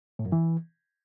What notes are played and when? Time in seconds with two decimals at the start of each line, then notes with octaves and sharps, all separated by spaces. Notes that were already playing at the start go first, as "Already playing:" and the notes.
0.19 A2
0.26 F#2
0.32 E3